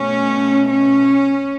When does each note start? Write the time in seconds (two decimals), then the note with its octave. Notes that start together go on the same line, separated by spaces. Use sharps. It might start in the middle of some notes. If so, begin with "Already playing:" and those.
Already playing: B2 A3 C#4
0.69 C#4